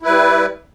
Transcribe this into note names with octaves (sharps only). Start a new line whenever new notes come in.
G3 E4 B4